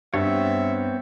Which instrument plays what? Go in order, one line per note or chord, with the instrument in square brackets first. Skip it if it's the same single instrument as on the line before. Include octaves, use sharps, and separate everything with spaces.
[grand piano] G2 [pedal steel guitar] B3 C4 C#5 [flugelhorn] E5